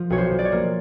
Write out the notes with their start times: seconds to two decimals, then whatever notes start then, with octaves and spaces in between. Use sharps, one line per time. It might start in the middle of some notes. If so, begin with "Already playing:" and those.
Already playing: F3
0.10 B1 C#5
0.18 C5
0.32 F3
0.39 D5
0.45 C#5
0.52 A#3